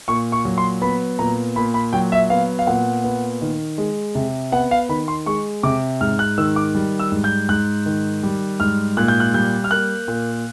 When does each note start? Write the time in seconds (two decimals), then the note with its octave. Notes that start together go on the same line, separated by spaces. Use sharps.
0.08 A#2 C#6
0.32 C#6
0.45 F#3
0.58 C6
0.82 B3 B5
1.19 A#2 A#5
1.56 A#2 B5
1.74 B5
1.93 F#3 G5
2.12 E5
2.30 B3 F5
2.59 F5
2.67 A#2 F#5
3.04 B3
3.41 D#3
3.78 G#3
4.15 C3
4.52 B3 F#5
4.71 F5
4.89 D#3 B5
5.08 C6
5.26 G#3 C#6
5.63 C3 D6
6.01 G#2 F6
6.19 F#6
6.38 D#3 E6
6.56 D6
6.75 G3
7.00 E6
7.12 G#2
7.24 G6
7.49 G#2 F#6
7.86 D#3
8.23 G3
8.60 G#2 F6
8.97 A#2 F#6
9.08 G6
9.20 F#6
9.34 G3 G6
9.64 F6
9.71 A#3 F#6
10.08 A#2